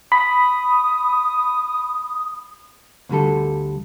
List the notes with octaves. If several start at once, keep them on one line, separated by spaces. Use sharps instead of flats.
B5 D#6
D2 D3 G3 A4